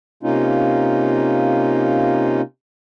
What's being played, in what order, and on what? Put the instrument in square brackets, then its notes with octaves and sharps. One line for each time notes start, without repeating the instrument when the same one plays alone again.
[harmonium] C3 A#3 C#4 D#4 F4